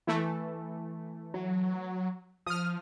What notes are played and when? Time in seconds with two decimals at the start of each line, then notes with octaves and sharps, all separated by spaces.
0.07 E3 A3
1.34 F#3
2.46 F3 D#6 F6